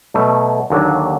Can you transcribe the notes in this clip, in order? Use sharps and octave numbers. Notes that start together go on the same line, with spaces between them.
B2 F#3 A3
D#2 D3 F#3 A#3 D4